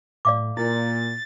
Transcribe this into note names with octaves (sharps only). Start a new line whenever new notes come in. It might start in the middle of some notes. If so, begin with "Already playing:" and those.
A2 D5 F5 D6
A#2 E4 A6